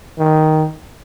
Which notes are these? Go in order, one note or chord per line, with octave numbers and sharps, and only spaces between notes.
D#3